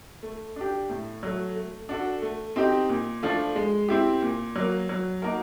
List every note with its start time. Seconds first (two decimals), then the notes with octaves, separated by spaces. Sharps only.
0.23 A3
0.56 D4 G4
0.89 A2
1.23 F#3 A3
1.56 A3
1.89 D4 F#4 A4
2.22 A3
2.56 C4 D#4 G4
2.89 A#2
3.23 F3 A3 D4
3.56 G#3
3.88 C4 E4 G4
4.22 A#2
4.56 F#3 A#3
4.89 F#3
5.22 A#3 D#4 F#4 A#4